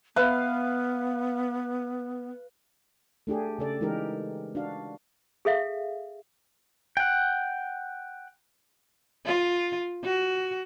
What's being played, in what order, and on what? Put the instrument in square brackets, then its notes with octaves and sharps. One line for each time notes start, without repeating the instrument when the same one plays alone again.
[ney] B3 [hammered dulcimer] B4 F5
[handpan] A3 D4 G4 G#4
C#3 A4 D5
E3 G#3 D#4 G4 A#4
D4 F#4 F5
[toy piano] G#4 A4 E5 F5
[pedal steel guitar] F#5 G5
[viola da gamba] F4
F#4